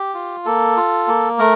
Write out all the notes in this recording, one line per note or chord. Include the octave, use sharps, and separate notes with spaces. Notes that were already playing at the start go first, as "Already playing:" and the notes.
Already playing: G4
F4
A#3 A4
F4
A#3
A3 A#4